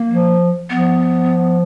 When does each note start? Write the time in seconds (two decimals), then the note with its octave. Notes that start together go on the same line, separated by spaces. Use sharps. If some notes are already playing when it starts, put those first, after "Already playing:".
Already playing: A#3
0.08 F3
0.70 F3 B3